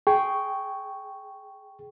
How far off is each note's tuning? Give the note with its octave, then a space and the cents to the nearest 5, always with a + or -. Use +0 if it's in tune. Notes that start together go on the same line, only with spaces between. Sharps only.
G#4 +10 G5 -10 C#6 +0